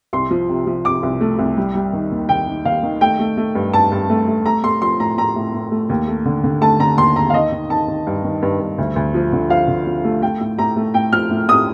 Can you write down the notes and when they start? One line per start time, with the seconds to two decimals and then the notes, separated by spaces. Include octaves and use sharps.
0.13 C2 C6
0.31 F3
0.49 C3
0.67 F3
0.85 C3 D6
1.03 C2
1.21 A3
1.39 C2
1.57 G3
1.74 G3
1.93 D#3
2.12 D#2
2.29 D#2 G5
2.48 D#3
2.65 D#2 F5
2.83 D#3
3.01 A3 G5
3.19 A3
3.37 A3
3.55 G2
3.73 G2 A5
3.92 G2
4.10 A3
4.28 A3
4.46 A3 A#5
4.64 A3 C6
4.82 F3 C6
5.00 A2 A#5
5.18 A2 A#5
5.36 A2
5.53 A2
5.71 A3
5.90 D#2
6.08 A3
6.26 D3
6.44 D3
6.61 A3 A5
6.79 D3 A#5
6.98 D#2 C6
7.16 D#2 A#5
7.30 F5
7.34 D#3 D#5
7.52 D#3
7.69 D#3 A5
7.88 D#3
8.07 G2
8.24 D#3
8.42 G2
8.60 G2
8.78 D2
8.96 D2
9.14 F3
9.33 D3
9.50 F3 F5
9.68 D3
9.87 F3
10.04 A3
10.22 A3 G5
10.41 A2
10.59 A2 A#5
10.76 A3
10.94 A2 G5
11.13 F3 F6
11.30 A2
11.48 A2 D#6